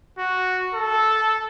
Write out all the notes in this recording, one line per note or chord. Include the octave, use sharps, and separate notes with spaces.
F#4
A4